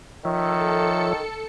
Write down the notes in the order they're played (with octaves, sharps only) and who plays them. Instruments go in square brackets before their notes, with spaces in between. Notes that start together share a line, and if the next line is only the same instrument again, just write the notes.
[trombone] D#3 [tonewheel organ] F3 C#5 E5 [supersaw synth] A4 C#7